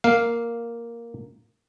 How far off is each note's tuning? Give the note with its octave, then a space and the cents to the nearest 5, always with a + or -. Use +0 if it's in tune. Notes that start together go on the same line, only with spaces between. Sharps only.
A#3 +0 F5 +0